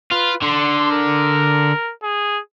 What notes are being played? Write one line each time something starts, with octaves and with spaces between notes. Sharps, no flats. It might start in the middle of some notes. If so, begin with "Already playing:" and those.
F4 B4
D3 C6
A#4
G#4